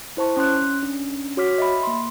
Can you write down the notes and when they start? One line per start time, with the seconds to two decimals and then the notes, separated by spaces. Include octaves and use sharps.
0.17 E4 C5 A5 C#6
0.37 C#4 C6 F#6
0.83 C#4 D4
1.37 F#4 C#5 D6 F6 B6
1.58 D#5 E5 B5
1.83 A#3 C6